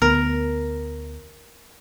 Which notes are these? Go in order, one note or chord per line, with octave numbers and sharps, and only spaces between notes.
D2 B3 A#4